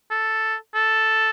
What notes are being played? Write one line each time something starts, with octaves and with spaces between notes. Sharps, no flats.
A4
A4